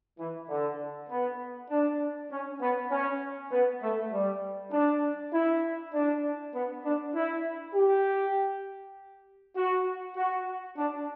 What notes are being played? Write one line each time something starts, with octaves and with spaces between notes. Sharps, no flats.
E3
D3
B3
D4
C#4
B3
C#4
B3
A3
G3
D4
E4
D4
B3
D4
E4
G4
F#4
F#4
D4